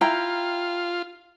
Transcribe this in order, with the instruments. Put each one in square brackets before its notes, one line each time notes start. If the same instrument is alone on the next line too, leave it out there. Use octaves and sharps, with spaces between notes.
[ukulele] E4 G5 A#5 [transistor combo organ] F4